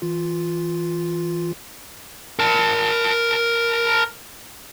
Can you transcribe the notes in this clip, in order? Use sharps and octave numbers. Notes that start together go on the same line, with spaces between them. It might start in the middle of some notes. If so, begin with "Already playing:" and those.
E3 F4
A#4 A5